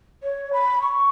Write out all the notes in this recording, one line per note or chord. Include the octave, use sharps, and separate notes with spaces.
C#5
B5
C#6